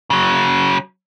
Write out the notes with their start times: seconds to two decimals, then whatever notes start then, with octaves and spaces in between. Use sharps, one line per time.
0.10 C#3 F#3